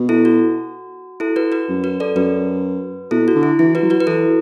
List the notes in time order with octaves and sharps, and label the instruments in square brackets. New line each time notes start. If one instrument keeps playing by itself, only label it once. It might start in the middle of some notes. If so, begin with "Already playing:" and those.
Already playing: [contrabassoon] B2
[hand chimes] E4 A4
F#4
E4 A4
F#4 B4
F#4 B4
[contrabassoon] F#2
[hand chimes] F#4 B4
A4 D5
[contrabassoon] F#2 [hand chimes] F#4 B4
[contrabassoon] B2 [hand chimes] E4 A4
[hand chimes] F#4
[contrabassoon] D3
[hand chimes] E4
[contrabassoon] E3 [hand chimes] E4
[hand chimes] F#4 B4
[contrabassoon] F#3
[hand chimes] F#4 B4
B4
[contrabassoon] E3 [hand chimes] E4 A4